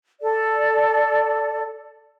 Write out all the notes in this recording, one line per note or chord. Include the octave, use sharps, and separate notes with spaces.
A4 D5